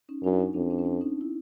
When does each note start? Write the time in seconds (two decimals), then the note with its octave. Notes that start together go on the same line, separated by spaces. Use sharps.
0.09 C#4 D#4
0.23 F#2 D4 E4
0.39 C#4 D#4
0.54 F2 C4 D4
0.70 C4 D4
0.79 C#4
0.85 C4 D4
1.01 C#4 D#4
1.21 E4